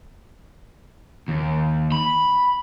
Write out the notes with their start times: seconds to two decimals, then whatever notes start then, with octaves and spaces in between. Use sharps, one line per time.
1.28 D#2
1.92 B5